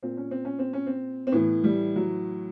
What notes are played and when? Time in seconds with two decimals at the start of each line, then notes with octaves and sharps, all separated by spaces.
0.03 A#2 C4
0.17 C#4
0.31 C4
0.45 C#4
0.59 C4
0.73 C#4
0.87 C4
1.27 C4
1.32 A2 E3 B3
1.64 G3
1.96 F#3